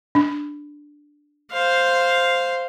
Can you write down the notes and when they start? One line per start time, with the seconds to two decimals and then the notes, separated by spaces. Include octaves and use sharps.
0.15 D4
1.52 C5 F5